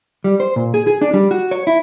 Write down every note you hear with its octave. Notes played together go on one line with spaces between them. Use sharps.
G3
C5
A#2
G#4
G#4
D4
G3
F#4
C#5
E4